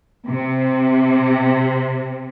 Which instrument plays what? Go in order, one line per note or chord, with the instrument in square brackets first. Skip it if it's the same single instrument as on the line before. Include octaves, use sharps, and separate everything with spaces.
[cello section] C3